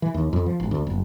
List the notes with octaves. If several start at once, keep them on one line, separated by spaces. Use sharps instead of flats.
E3
D#2
F2
F3
G#1
D2
F#1